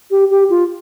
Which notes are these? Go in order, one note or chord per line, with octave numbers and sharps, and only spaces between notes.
G4
G4
F4